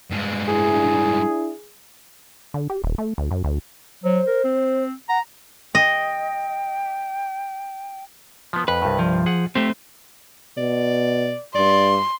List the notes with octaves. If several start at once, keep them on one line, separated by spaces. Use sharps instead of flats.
G2 G#3
D4 E4 G#4
D3
G4
D#1
A3
D2
F#2
D2
F#3 C5
A#4
C4
F#5 A#5
D#5 G5
F3 B3
F2 B4
C2 G2
F3
G#4 F#5
A3 C4 G4 C5
B2 D5
G2 D5 C6